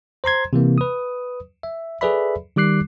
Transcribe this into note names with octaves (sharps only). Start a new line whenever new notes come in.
C5 A#5 C6 G#6
C3 E3 A#3
B4 D#6
E5
G#4 A4 B4 D5 E5 B5
D#3 G3 D6 F#6 C7